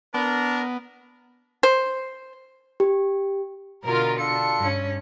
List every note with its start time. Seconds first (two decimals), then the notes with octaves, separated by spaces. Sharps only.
0.14 B3 D4 A#4
1.63 C5
2.80 G4
3.84 B2 D3 F4 A#4
4.19 D4 F4 A4 C#7
4.58 G2 C#4